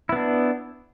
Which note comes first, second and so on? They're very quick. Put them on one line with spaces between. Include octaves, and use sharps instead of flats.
E4 B3 D4